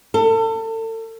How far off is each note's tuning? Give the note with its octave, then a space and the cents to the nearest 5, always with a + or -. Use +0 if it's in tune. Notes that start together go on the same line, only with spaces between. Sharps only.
A4 +35